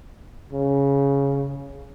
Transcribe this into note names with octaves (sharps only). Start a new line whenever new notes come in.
C#3